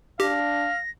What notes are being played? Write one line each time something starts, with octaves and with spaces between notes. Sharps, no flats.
D4 G4 F5 A#6